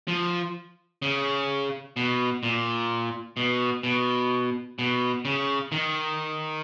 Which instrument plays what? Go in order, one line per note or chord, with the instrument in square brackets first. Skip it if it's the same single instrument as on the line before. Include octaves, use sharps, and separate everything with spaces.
[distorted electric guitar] F3
C#3
B2
A#2
B2
B2
B2
C#3
D#3